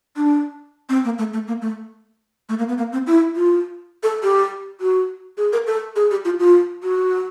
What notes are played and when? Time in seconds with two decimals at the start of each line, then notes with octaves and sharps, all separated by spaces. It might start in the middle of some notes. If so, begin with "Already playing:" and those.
0.17 D4
0.89 C4
1.05 A#3
1.18 A3
1.33 A3
1.48 A#3
1.62 A3
2.49 A3
2.58 A#3
2.69 B3
2.78 A#3
2.93 C4
3.07 E4
3.36 F4
4.03 A4
4.23 G4
4.81 F#4
5.37 G#4
5.53 A#4
5.67 A4
5.96 G#4
6.11 G4
6.25 F4
6.39 F4
6.83 F#4